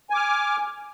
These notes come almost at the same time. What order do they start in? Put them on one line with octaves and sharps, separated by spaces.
G#5 D6 F6